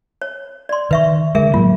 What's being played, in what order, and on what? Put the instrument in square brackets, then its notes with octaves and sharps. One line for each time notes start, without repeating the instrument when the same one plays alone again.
[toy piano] C#5
D5 C6
[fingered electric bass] D#3 [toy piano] B4 E5 C#6
[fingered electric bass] D3 G#3 [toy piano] G#4 A#4 E5
[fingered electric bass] A2 F#3 A#3 [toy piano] F4